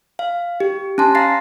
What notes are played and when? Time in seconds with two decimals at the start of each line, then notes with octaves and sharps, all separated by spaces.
0.19 F5
0.60 G4
0.98 C#4 G#5 A5 C6
1.15 F5 A#5 A6 A#6 C7